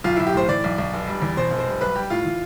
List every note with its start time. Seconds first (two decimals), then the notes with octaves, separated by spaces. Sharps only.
0.04 B1 F4
0.16 B1 E4
0.27 G4
0.34 A2 C5
0.48 E3 D5
0.64 B1
0.78 B1
0.93 F1
1.08 G3
1.22 E2
1.37 B2 C5
1.51 F1
1.59 C5
1.66 G3
1.81 B1 B4
1.96 G3 G4
2.10 A2 F4
2.25 E3